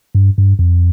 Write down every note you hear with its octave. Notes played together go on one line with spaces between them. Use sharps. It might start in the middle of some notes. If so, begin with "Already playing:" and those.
G2
G2
F2